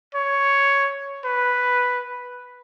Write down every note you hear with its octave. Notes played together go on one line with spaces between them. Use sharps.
C#5
B4